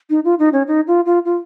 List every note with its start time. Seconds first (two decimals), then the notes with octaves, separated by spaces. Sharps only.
0.10 D#4
0.25 F4
0.39 D#4
0.53 C#4
0.67 D#4
0.87 F4
1.06 F4
1.25 F4